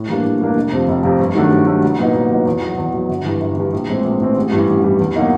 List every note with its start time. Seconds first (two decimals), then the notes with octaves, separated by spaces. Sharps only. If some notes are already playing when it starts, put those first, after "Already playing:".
Already playing: A2
0.09 E3 G3 A#3 D4
0.25 A2
0.40 E3 G3 A#3 D4
0.56 F1
0.72 F2 C3 F3
0.88 F1
1.03 F2 C3 F3
1.19 G2
1.35 D#3 F#3 A3 D4
1.51 G2
1.67 D#3 F#3 A3 D4
1.83 C2
1.99 A#2 F#3 B3 D#4
2.14 C2
2.30 A#2 F#3 B3 D#4
2.46 E2
2.62 B2 F#3
2.78 E2
2.94 B2 F#3
3.09 G1
3.25 G2 E3
3.41 G1
3.57 G2 E3
3.73 A#1
3.89 A2 E3 G#3 C4
4.04 A#1
4.20 A2 E3 G#3 C4
4.37 A1
4.52 G2 E3 G3
4.68 A1
4.84 G2 E3 G3
4.99 E2
5.15 B2 F#3 A#3 D#4